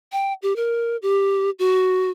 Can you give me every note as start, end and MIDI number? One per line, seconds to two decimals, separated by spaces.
0.12 0.33 79
0.42 0.56 67
0.56 0.97 70
1.02 1.50 67
1.59 2.10 66